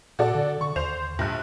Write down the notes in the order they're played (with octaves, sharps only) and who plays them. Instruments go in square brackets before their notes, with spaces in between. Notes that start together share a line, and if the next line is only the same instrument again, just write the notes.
[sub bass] A#2 [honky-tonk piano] F#4 A4 D5
[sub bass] D3
[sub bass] D3 [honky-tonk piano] C#6
[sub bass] D#2 [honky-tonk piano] C5 F7
[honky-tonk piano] A#1 G2 F#6